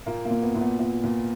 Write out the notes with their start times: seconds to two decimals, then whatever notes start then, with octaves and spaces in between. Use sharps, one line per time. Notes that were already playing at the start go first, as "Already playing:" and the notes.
0.06 A#2 A#3
0.25 A#3
0.30 A#2
0.43 B3
0.55 A#2
0.61 B3
0.79 A#2
1.03 A#2